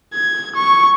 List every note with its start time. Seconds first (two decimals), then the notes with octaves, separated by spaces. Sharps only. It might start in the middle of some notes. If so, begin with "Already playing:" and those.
0.14 G#6
0.55 C#6